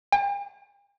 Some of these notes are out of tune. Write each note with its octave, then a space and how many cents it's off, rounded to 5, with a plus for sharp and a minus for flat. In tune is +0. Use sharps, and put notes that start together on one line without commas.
G5 +45